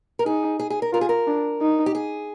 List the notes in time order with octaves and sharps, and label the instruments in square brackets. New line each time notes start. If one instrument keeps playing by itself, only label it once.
[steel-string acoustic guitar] A#4
[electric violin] D#4 [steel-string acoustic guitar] G#4
[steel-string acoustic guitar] G#4
G#4
A#4
[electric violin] F4 [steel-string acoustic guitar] A#4
[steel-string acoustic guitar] G#4
A#4
[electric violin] D4
D#4
[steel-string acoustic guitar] G4
G#4